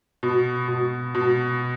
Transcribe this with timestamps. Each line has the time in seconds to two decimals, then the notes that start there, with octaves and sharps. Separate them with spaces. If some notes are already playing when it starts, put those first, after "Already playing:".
0.23 B2
0.68 B2
1.15 B2